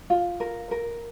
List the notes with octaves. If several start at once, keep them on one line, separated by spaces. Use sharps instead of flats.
F4
A#4
A#4